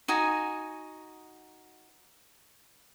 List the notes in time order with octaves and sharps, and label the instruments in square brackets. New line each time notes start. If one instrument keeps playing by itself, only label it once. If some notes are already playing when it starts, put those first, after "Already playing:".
[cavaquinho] D#4 F#4 G#5